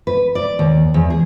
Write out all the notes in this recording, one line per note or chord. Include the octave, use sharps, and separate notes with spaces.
B4
D5
D#2
E2
G#4